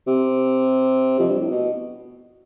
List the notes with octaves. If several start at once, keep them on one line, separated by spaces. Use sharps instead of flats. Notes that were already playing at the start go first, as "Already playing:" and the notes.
C3
F2
G2
A2
B2